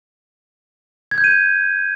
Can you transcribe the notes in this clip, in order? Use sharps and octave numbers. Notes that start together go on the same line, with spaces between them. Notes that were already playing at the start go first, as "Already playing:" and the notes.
G#6
G6
D#7